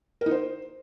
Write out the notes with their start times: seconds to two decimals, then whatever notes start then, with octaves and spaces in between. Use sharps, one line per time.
0.21 A#4
0.26 D#4
0.31 C5